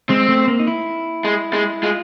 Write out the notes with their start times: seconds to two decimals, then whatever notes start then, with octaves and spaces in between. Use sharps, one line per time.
0.09 G#3 C4
0.29 A3
0.48 A#3
0.60 D#4
0.67 E4
1.24 G#3
1.53 G#3
1.83 G#3 F4